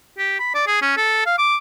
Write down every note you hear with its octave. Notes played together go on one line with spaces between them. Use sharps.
G4
B5
D5
G#4
C#4
A4
F5
D6